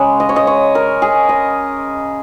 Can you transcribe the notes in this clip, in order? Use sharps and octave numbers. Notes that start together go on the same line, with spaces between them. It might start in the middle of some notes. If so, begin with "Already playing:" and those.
Already playing: C#3 G#3
D#5
C#5
D#5
C#5
A#4
G#4
D#5